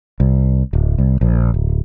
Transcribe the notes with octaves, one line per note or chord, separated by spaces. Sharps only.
C2
D1
C2
A#1
D1